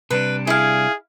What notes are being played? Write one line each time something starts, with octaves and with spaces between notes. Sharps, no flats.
C3 G3 D4 B4
E4 G#4 F5